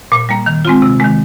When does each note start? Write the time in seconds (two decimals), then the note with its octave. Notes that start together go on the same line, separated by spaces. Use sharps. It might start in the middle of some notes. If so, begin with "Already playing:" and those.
0.12 A#2
0.29 G3 A#3
0.46 D#3
0.65 G#3 C4 F4
0.82 C3
1.00 D#3 G#3